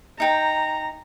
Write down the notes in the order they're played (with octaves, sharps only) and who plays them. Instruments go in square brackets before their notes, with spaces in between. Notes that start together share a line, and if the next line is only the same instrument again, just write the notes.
[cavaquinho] D#4 G5 [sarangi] A#5